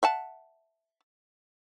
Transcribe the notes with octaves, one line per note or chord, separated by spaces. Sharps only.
E5 F#5 A5